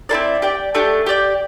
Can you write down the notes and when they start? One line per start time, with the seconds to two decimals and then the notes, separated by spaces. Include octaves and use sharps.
0.09 C4 E4 A4 D5
0.42 G4 D5 G5
0.75 A3 D4 G4
1.06 G4 D5 G5